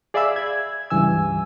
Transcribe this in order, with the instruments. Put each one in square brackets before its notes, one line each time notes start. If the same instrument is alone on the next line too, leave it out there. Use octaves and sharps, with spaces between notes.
[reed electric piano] G#4 D5 E5 F5 B5 E6
G#6
C#2 G2 E3 G#5 E6